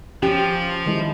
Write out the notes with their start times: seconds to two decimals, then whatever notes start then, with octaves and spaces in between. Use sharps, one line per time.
0.23 F3 C#4 G4
0.86 D#3 G#3 E4